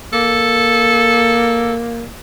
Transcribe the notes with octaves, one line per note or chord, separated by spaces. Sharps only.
A#3 A4